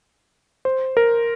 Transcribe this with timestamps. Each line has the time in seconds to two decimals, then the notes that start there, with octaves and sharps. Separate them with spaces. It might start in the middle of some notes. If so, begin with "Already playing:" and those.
0.65 C5
0.97 A#4